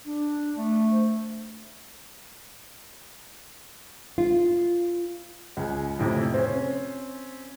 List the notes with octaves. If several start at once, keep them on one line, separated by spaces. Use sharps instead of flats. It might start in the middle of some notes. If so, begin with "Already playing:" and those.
D4
A3
C5
F4
C#2 G#5
F2 A2 C3 E4
C4 C#4